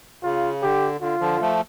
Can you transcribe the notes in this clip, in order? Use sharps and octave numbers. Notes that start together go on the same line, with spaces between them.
C#3 F4
D3 G4
D3 F4
D3 F3
F3 A3